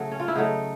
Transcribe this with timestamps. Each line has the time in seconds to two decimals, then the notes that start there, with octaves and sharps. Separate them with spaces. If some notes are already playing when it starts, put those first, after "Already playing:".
Already playing: C#3 F#3 A3
0.12 C#4
0.20 F4
0.28 E4
0.35 C#3 F#3 A3 D#4